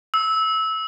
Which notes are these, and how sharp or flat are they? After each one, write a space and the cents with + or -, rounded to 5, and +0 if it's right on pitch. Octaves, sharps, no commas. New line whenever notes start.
E6 -20